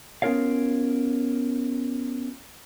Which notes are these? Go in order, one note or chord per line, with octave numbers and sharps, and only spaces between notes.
B3 C#4 F4 A#4 C#5 F5